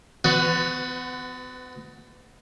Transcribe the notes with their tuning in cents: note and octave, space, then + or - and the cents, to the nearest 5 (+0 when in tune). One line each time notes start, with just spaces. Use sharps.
B3 +40 F#4 +0 B4 +20